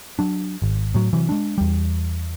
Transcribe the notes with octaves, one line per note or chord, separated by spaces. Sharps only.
F#3 D4
G#1
A2 F#3
C3 E3 F#3
G#3 D4
E2 G3